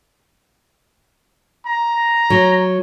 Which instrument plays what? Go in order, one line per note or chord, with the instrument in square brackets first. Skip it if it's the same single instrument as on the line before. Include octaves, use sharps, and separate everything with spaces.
[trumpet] A#5
[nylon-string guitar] F#3